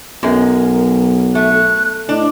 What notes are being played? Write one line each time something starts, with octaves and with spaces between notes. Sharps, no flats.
B1 F#2 G#3 A#4
A3 F#6
A2 D4 D#5